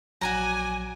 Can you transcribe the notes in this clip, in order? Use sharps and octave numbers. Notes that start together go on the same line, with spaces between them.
A#1 F#3 F#4 D5 G#5 A#5